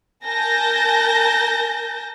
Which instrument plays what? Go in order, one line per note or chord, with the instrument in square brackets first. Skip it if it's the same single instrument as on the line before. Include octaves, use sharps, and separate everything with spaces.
[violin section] A#4 G#5 A5 G6 A#6